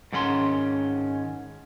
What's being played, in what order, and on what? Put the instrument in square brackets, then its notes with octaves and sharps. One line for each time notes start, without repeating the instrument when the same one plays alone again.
[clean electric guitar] G#2 D#3 C#4 B5 C6